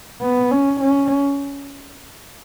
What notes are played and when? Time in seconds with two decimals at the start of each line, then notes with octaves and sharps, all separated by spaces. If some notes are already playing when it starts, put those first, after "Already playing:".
0.22 B3
0.52 C#4
0.81 C#4